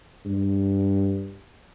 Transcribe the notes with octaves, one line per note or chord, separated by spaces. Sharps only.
G2